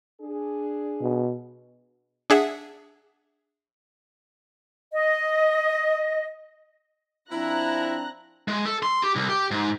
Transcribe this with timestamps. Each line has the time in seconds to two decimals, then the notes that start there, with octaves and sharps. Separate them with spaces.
0.21 D4 G#4
1.01 B2
2.30 D4 G#4 E5 F#5
4.93 D#5
7.32 F3 C4 D4 E4 A#5 F#6 A#6
8.48 G#3
8.65 A4
8.83 C6
9.03 G4
9.16 C2
9.29 G4
9.51 G#2